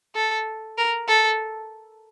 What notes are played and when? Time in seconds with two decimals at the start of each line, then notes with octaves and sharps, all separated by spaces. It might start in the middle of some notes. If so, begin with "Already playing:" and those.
0.15 A4
0.78 A#4
1.08 A4